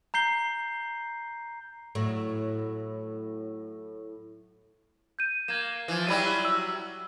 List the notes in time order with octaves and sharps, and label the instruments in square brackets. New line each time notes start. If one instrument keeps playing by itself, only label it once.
[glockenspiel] A#5 G6 C7 G7
[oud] A2 F#3
[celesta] G6 D#7
[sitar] A#3 [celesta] G#6 E7
[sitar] E3 F3
[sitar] F#3 G3 E4 [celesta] B5 D#7
[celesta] E6